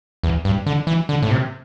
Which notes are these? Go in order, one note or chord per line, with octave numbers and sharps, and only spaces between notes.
E2
G2
D3
E3
D3
A2
C3